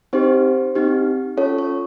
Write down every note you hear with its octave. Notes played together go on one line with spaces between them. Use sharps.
C4 D#4 G4 C5
C4 D#4 G4
C#4 F4 A4 C#5
C#5